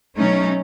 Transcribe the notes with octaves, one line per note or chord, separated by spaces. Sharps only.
B2 F#3 A3 C#4 D#4